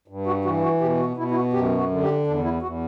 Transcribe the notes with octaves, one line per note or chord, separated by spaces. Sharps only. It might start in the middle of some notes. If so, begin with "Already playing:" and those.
G2
F#4
E3 F#4
F#4
B2 G4
F#4
B2 E4
E4
F#4
F#2 G4
F#4
D3
G4
E2 D4
E4
E2 F#4